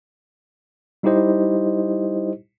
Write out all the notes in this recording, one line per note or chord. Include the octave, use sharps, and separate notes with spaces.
G3 D#4 E4 G4 C5 D#5